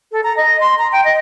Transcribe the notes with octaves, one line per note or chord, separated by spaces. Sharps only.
A4
A#5
D#5
C6
A#5
G5
D#5